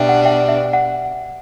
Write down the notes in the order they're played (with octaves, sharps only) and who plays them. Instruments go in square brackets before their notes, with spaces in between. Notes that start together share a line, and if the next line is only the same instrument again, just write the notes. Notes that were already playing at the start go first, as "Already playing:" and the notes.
Already playing: [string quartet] B2 G3 D4 [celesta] E5
[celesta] F#5
E5 G5
E5
F#5